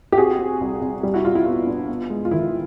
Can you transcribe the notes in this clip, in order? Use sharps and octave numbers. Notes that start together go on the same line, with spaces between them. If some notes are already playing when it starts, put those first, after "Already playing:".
G4
C4 F#4 G#4
C4
C2
C2
G3
E4 F#4
G3 F4
E4
B3 F4
D4
B3
G#3
F4
D#3 E4